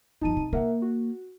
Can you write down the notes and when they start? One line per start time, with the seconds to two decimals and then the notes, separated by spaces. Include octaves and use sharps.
0.21 G1 F3 D#4 A5 D#7
0.37 C3
0.53 A#3 A#4 E5 F#5
0.82 F#4